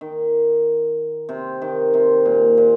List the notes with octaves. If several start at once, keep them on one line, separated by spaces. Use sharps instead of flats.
D#3
C3
D#3
C3
A#2
A#2